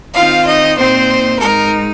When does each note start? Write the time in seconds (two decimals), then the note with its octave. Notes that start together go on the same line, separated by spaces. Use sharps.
0.16 D#3 C4 D#4 F4 F5
0.47 D#4 D#5
0.78 A#2 A#3 C4 D#4 C5
1.40 G#2 G#3 D#4 A#4